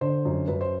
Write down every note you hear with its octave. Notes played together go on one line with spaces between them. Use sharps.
D3 C5
F#2
F#2 B4
C5